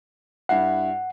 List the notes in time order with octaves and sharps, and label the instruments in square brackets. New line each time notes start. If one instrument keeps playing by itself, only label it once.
[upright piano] G2 E4 C7 [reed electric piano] F#5